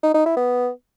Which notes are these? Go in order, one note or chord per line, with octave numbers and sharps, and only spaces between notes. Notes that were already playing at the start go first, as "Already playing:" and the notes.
D#4
D#4
E4
B3